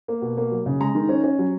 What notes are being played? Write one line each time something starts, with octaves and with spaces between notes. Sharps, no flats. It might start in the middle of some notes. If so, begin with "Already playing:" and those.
A#3
B2
A#3
F#3
C#3
G#3 A#5
D#3
C#4
C#4
F#3